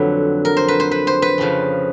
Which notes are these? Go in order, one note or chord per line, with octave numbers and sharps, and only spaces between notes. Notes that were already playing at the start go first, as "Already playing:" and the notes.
Already playing: F2 D3 F#3 B4
A#4
C5
B4
C5
B4
C5
B4
F2 C#3 F3